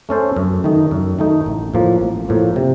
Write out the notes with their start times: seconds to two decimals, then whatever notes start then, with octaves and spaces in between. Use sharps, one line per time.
0.09 A3 C#4 A4 C5
0.36 F#2
0.64 D#3 A3 D#4
0.91 F#2
1.19 D#3 A3 D#4
1.46 A1
1.74 A2 F3 A#3
2.01 A1
2.29 A2 F3 A#3
2.56 C3